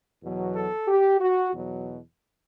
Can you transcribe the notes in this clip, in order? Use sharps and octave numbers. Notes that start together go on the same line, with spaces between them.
E2 B2 F#3
A4
G4
F#4
E2 B2 F#3